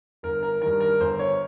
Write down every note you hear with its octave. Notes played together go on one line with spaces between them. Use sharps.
G1 A#4
A#4
G2 D#3 A#4
A#4
G1 C5
C#5